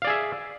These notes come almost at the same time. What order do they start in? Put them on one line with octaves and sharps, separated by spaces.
F5 D5 G#4 E5